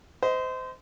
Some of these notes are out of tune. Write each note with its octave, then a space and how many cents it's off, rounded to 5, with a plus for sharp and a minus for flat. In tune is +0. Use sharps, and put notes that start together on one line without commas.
C5 -30 D#5 +20